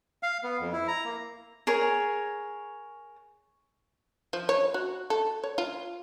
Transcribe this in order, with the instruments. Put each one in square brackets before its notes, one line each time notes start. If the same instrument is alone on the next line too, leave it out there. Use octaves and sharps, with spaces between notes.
[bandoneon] F5
B3
F2
E4
A#5
A#3
[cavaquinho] G#4 A#4 C#5
[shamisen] F3
C#5
F#4
A4
C#5
F4